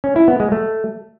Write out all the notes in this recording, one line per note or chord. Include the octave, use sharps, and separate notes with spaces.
C#4
E4
B3
G#3
A3